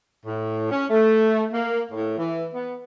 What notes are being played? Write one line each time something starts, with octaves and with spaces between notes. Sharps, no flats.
A2
C#4
A3
A#3
A2
E3
B3